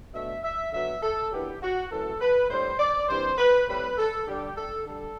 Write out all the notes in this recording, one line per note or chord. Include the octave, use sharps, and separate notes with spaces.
B2 A3 D4 E5
E5
D3 F#3 B3 E5
A4
F#2 E3 B3 D4 G4
F#4
F#2 E3 A3 A4
B4
A2 G3 D4 C5
D5
C3 E3 G3 D4 C5
B4
A2 G3 C4 B4
A4
D3 G3 D4 G4
A4
D3 G3 A4